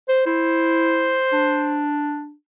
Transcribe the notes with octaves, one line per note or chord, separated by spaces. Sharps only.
C5
E4 C5
D4